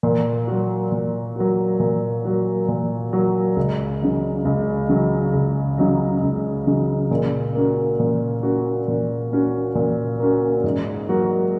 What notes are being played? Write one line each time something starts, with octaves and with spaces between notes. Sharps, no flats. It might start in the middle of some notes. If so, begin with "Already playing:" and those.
A#2
F#3 A#3 F#4
A#2
F#3 A#3 F#4
A#2
F#3 A#3 F#4
A#2
F#3 A#3 F#4
C#2
C#3 F#3 D#4
C#2
C#3 F#3 D#4
C#2
C#3 F#3 D#4
C#2
C#3 F#3 D#4
A#2
A#3 C#4 F#4
A#2
A#3 C#4 F#4
A#2
A#3 C#4 F#4
A#2
A#3 C#4 F#4
G#2
F#3 A#3 F#4